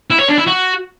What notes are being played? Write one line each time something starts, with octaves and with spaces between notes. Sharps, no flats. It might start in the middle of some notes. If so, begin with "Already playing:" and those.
E4
C#5
D4
E4
F#4